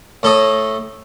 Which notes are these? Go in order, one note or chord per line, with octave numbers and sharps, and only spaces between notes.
A2 A4 D#5